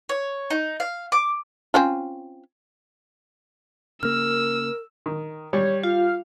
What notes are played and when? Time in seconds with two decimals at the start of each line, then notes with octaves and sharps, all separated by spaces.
0.09 C#5
0.50 D#4
0.80 F5
1.12 D6
1.74 C4 C#4 F4
4.03 C#3 A#3 A#4 E6 F6
5.06 D#3
5.53 G3 C#5
5.84 F4 F5